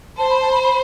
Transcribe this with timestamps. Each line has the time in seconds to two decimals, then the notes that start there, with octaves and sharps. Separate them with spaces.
0.18 C5 A5
0.30 B5
0.41 A5
0.52 B5
0.63 B5